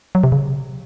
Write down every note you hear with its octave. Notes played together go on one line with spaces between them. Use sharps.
F#3
C3
C#3